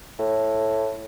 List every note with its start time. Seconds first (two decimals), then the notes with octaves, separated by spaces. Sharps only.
0.19 A2